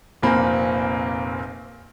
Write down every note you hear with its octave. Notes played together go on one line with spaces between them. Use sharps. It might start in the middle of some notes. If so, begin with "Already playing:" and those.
F1 A#1 A#2 A#3 C4 B5